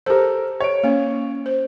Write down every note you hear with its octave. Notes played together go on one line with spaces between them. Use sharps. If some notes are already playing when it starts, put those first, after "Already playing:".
G4 A4 A#4 C5
C#5 D7
A#3 C#4
C5